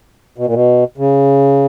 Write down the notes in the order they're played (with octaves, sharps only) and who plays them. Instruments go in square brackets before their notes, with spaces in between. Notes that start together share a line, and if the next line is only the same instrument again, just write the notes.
[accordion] B2
A#2
B2
C#3